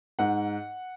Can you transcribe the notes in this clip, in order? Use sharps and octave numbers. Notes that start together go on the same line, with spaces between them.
G#2 F#5